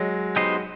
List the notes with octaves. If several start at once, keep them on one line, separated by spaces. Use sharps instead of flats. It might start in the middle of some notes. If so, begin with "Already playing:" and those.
Already playing: F#3 G#3
B3 D#4 G4 C5 D#5